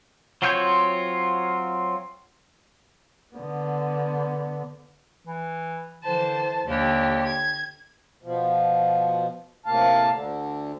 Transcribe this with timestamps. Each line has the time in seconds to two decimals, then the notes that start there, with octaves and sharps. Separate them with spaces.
0.42 F#3 C4 F4 C#5 G6
3.35 D3 B3
5.27 E3
6.05 D3 E3 C5 A5
6.66 D#2 D3 G4
7.27 G#6
8.23 B2 F3
9.66 A2 C3 A#3 F5 A5
10.11 D2 D3